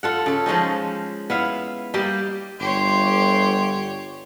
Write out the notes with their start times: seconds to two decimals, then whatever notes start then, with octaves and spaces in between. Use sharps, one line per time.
0.03 F4 A4 F#5
0.26 C#3 A4
0.46 F3 G#3 C#4 D#4
1.30 B3 E4 F5
1.94 G3 A#3 G4 D#5
2.60 G1 G4 C#5 C6